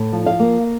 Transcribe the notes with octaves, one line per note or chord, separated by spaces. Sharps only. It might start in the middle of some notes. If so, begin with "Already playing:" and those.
Already playing: A2
F3
F5
A#3